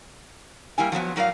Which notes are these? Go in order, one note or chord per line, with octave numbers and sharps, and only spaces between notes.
G3 A#3 E4 G#5
F3 F#3 A#3 B3
A2 F#3 A#4 D5 F5